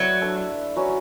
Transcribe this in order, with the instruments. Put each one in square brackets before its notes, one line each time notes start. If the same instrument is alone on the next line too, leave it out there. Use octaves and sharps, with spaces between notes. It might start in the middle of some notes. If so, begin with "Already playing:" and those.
Already playing: [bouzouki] F#3 [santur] A3 E4 B4 D5
[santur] D4 A4 E5
F#3 C#4 F#4 B4